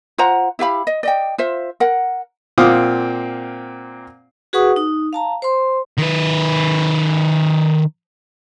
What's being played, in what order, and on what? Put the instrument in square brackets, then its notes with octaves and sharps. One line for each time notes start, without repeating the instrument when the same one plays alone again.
[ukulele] F4 C5 F#5 A#5
E4 G4 F5 B5
D#5
D5 D#5 G5
F4 C5 E5
A#4 F#5
[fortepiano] A#2 C4 F5 F#5 D6 D#6
[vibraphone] F#4 G#4 B4 F#5 C#6 D#6
D#4 D#6
F5 A5 A#5
C5 C6
[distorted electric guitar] D#3 B4